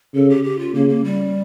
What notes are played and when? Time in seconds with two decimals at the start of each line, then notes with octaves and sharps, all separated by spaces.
0.15 C#3 A4
0.30 G4
0.44 G4
0.59 F4
0.74 C#3 A#3
0.89 A#3
1.04 G3